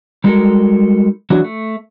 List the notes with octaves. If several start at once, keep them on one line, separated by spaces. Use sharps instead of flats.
G3 G#3 D#4 F#4 A4 A#4
E3 F#3 D4 F#4
A3